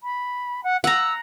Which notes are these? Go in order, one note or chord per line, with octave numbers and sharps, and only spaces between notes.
B5
F#5
F#5 A#5 E6